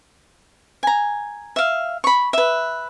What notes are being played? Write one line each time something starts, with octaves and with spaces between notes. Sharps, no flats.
G#5 A#5
E5 F5
B5 C#6
B4 E5